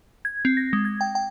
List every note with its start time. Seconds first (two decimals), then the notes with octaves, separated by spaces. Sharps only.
0.25 G#6
0.45 C4
0.57 A#6
0.73 G#3
0.85 G#6
1.01 G5
1.15 G5